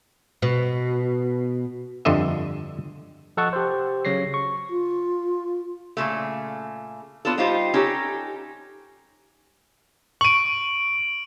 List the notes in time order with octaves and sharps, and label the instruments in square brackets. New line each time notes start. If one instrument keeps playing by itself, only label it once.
[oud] B2
[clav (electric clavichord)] G1 F2 D3 D#5 E5
[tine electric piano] F3 A4 D#5 F#5 A5 C#6
G4 C5
C#3 F#3 C#5 A#6 C7
C#6
[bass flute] F4
[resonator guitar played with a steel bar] A#2 C#3 A3
B3 D4 F4 A4
G3 D#4 F4 G4 C5
C#4 D#4 G4 A4
[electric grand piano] C#6 D#7 [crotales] D7 F#7